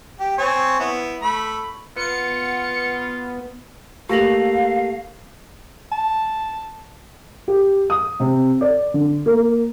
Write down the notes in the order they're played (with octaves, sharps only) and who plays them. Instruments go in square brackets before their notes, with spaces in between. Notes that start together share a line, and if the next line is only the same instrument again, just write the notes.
[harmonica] G4
C4 C#5 G#5
B3 E4
A3 B5
[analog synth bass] B3 [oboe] F4 [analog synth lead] C#7
[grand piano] A3 A#3 F#7 [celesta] G4 A#6 F7 [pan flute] F5
[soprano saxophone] A5
[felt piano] G4
D#6
C3
D5
D3
A#3